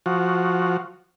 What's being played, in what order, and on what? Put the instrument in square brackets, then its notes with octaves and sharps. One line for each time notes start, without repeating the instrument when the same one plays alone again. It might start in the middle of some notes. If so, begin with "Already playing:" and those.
[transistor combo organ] F3 F#4